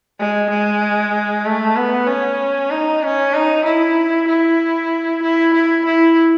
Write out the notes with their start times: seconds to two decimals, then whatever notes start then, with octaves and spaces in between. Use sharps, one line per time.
0.19 G#3
0.51 G#3
1.45 A3
1.76 B3
2.08 C#4
2.71 D#4
3.03 C#4
3.34 D#4
3.65 E4
4.28 E4
5.23 E4
5.54 E4
5.86 E4